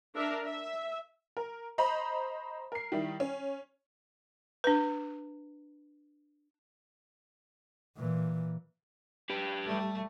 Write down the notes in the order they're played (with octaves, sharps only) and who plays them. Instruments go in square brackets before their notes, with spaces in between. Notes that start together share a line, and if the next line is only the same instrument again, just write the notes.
[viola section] D4 A#4 E5
E5
[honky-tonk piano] A#4
C5 D#5 A#5 B5
A#4 C7
D#3 G3 E4
C#4
[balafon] D4 B4
[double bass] A#2 E3
[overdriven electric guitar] G4 B4
[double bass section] G3 [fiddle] A3